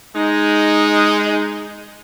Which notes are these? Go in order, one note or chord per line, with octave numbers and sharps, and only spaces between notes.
G#3 D#4